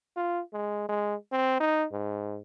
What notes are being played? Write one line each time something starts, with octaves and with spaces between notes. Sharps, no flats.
F4
G#3
G#3
C4
D#4
G#2